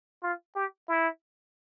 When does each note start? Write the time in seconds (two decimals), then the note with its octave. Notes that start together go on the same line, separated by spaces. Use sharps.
0.23 F4
0.55 G4
0.88 E4